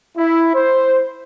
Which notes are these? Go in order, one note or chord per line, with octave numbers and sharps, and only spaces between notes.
E4
C5